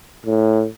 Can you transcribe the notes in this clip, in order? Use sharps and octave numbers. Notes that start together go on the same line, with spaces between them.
A2